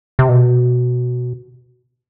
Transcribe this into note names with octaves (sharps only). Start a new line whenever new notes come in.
C3
B2